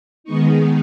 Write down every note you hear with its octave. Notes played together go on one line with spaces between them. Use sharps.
D#3 G#3 B3 D#4 C#6